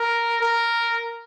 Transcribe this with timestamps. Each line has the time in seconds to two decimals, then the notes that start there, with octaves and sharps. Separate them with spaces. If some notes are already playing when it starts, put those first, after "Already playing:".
Already playing: A#4
0.40 A#4